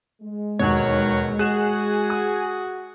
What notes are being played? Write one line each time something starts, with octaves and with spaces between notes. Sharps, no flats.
G#3
E1 D#2 B2 D#3 F#3 C#5
F#4 G#4 F#6 E7
D#6